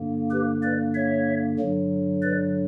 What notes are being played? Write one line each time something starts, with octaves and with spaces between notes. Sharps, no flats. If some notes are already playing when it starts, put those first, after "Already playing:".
Already playing: G2 D3 A#3
G4 B4
B4 D5
C#5 E5
G2 D3 F#3
B4 D5